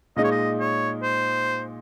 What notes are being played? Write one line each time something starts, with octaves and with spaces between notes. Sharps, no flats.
A#2 G#3 D#4 D#5
C#5
D#5
C#5
C5